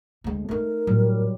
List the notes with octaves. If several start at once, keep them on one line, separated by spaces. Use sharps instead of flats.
D2 G#3
A3 D#4 A#4
A2 F#3 G3